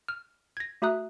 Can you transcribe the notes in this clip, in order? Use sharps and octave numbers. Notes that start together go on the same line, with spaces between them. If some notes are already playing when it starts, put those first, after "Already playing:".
F6
G#6 A#6
A3 F#4 E5 A#5 D#6 F#6